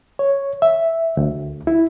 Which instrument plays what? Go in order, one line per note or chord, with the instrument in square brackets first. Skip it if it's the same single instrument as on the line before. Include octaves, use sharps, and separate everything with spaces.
[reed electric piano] C#5
E5
D2
E4